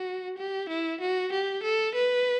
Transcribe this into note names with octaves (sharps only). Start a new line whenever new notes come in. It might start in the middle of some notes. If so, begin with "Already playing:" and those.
Already playing: F#4
G4
E4
F#4
G4
A4
B4